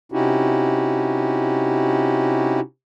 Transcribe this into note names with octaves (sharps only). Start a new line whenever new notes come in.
C3 C#4 D#4 E4 F#4 G4